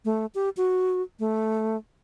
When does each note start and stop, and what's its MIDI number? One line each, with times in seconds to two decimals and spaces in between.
0.05 0.26 57
0.35 0.49 67
0.57 1.02 66
1.19 1.77 57